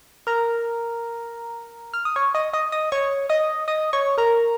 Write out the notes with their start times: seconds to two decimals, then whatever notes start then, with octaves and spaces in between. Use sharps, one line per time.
0.27 A#4 A#5
1.94 F6
2.05 D#6
2.16 C#5 C#6
2.35 D#5 D#6
2.53 D#5 D#6
2.72 D#5 D#6
2.92 C#5 C#6
3.29 D#5 D#6
3.68 D#5 D#6
3.93 C#5 C#6
4.18 A#4 A#5